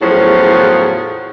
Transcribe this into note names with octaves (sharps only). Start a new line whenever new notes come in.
E2 A2 C#3 F3 F#3